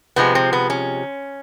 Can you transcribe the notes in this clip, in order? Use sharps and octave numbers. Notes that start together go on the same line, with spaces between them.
C3 F3 G#3 B3
C4
B3
C#4